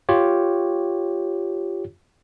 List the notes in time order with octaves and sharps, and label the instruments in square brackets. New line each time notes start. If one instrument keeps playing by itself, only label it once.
[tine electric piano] F4 G4 C#5